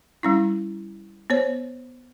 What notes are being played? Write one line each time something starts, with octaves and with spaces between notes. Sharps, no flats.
G3 C#4 E4
B3 C5 C#5